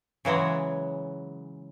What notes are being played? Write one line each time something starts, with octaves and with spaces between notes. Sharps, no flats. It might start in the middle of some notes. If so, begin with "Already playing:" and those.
C#3 E3 F#3 G#3